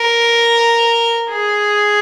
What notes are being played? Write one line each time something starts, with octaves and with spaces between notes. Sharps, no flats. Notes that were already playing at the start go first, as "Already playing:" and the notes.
Already playing: A#4
G#4